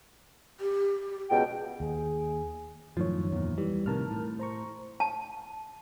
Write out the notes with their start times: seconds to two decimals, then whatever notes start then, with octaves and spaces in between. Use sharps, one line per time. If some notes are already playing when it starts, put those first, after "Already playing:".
0.60 G4
1.29 C#2 B2 G5
1.80 D#2 G#4
2.97 F#2 A2 D#3 F3 C#5
3.32 E2 A#2
3.58 E3 G3
3.86 A2 C3 D#3 A#4 A5 F6
4.11 A2
4.39 C5 A#5 C#6
5.00 A5